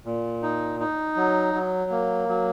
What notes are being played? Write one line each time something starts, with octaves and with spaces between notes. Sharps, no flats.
A#2
D#4
D#4
F#3
F#3
A#3
F#3